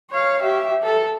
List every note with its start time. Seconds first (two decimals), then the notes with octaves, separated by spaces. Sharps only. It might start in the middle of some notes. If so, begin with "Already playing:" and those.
0.10 C#5 F5
0.42 G4 E5
0.83 A4